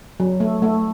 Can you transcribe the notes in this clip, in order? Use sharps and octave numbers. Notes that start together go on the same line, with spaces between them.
F#3
A3
A3